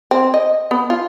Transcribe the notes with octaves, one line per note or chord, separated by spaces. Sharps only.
C4
D#5
B3
F4